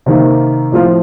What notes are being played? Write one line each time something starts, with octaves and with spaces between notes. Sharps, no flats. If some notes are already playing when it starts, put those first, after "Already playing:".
C3 D#3 A#3
A2 F3 C4 F4